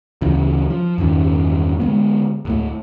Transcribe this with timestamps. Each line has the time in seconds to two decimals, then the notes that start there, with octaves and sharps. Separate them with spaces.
0.21 D2 C#3 E3
0.70 F3
0.98 E2 G2 D#3 C#4
1.80 D3 G#3 B3
2.45 D1 A2 A3